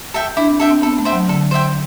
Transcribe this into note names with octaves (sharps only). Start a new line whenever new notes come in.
A4 E5 G5
D4 E4
C4
D4 A4 E5 G5
C4
B3 A4
A3
C5 E5 G5
F#3
D3 A4
C5 E5 G5